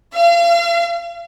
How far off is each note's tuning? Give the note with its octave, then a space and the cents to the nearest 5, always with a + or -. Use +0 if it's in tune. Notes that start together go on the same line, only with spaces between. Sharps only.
F5 -35